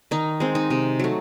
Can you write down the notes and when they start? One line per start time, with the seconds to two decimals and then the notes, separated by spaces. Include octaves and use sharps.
0.11 D#3 D#4
0.40 G#3 C4
0.55 D#4
0.70 C3
0.99 F#3 A3